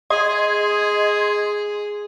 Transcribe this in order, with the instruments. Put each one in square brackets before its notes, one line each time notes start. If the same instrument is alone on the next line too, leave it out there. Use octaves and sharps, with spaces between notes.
[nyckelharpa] G#4 [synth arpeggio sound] D#5 C6 G#6